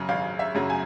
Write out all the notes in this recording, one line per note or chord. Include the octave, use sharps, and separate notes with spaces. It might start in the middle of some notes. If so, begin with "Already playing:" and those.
Already playing: F#2 C#3 F#3
G#1 F5
E5
F#2 C#3 F#3
G#5